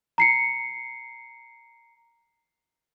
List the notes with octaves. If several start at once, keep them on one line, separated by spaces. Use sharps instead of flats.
A#5 C7 C#7